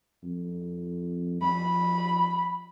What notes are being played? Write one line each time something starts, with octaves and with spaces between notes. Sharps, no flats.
F2
F3 B5